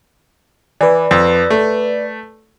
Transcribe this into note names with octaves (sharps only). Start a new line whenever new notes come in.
E3 B4 D5
F2
A3